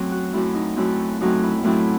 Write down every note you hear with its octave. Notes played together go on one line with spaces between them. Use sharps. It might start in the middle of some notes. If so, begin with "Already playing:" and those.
Already playing: F#2 F#3 A3 C4
F#4
F#2 F#3 A3 C4 E4
D#4
F#2 F#3 A3 C4 E4
F#2 F#3 A3 C4 D#4
E4
A2 F#3 A3 C4 E4